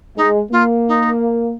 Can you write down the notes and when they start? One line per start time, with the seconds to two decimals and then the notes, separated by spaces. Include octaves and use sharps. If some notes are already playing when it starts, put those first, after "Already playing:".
0.16 G#3 D#4
0.52 A#3 F4
0.88 D#4